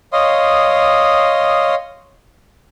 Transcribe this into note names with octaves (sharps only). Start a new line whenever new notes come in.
C#5 D#5 F5 C6 D#6